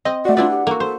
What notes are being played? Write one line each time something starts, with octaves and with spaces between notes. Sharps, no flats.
C4 D#5
A3 F#4 D5 F#5
D4 E4 F4 B4 D5
G4
A#3 F#4 A4
A4 C5